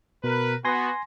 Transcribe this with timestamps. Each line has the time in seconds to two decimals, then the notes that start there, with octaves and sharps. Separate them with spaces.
0.24 B2 A#4 B4
0.65 B3 F#4 G#5 C6 A#6